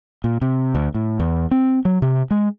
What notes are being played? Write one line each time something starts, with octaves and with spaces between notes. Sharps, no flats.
A#2
C3
D2
A2
E2
C4
F#3
C3
G#3